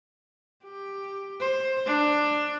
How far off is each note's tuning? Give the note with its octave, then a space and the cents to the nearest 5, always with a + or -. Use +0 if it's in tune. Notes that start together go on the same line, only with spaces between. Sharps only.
G4 +10
C5 +15
D4 +10